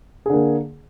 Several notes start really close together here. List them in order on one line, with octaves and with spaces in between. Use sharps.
G#4 D3 A#3